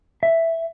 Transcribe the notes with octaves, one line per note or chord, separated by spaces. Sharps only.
E5